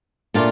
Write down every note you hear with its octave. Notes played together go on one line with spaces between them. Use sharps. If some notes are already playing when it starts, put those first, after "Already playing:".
A#2 A3 D4 F4